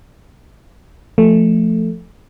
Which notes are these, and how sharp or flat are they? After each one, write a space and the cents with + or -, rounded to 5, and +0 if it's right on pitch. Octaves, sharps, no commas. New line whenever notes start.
F3 -10 A3 +5